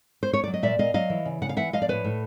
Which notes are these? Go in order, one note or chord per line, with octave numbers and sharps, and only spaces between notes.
C5
C#5
F#3 D5
D#5
A#2 D5 E5
A#2 D#5 F5
F#3 D#5 F5
E3
C#3
C#3 F#5
F5
E3 E5 F#5
F3 D#5 F5
D5
A2 B4 C#5
A2